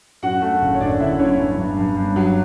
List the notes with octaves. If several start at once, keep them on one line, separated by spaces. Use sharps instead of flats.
F#2 F#4 F#5
A3
F#1
C#5
F#1 D4 D5
D3 E4 E5
F#2 C#4 C#5
G2
G2
G2
G2
F#3